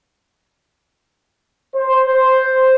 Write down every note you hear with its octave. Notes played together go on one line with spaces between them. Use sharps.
C5